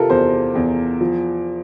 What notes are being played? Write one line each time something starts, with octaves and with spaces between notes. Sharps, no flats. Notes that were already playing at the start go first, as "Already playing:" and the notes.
Already playing: C3 F4 A4 A#4
E2 C5
E2
F3